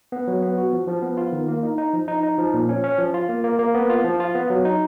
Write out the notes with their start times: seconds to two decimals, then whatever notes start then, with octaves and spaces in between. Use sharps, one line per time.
0.12 B3
0.28 F#3
0.42 B3
0.58 F#4
0.73 F3
0.88 F3
1.02 B3
1.17 F4
1.32 D#3
1.48 A#3
1.63 D#4
1.78 D#4
1.93 F3
2.08 D#4
2.23 D#4
2.38 F3
2.54 A#2
2.69 C#4
2.84 C#4
2.98 F3
3.14 F4
3.29 A#3
3.44 A#3
3.59 A#3
3.75 B3
3.90 F4
4.04 F3
4.20 F4
4.35 B3
4.50 F#3
4.65 D#4